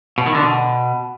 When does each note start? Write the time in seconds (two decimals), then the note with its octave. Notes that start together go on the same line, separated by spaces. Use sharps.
0.18 B2
0.26 D#3
0.35 D3
0.43 B2